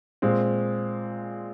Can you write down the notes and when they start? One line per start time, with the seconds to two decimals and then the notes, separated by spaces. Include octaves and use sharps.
0.22 A#2 G#3 C4